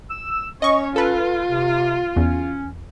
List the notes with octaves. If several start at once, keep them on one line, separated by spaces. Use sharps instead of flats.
E6
C#4 C#5 D#5 C#6
F4 A4 B4
C3
E2 C#4